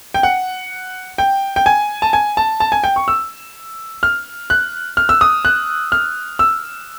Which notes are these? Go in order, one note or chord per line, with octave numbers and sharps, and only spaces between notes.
G5
F#5
G5
G5
G#5
A5
G#5
A5
A5
G#5
G5
C#6
E6
F6
F#6
F6
E6
D#6
F#6
F6
E6